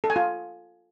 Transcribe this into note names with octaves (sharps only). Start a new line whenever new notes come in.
A4
G#5
F4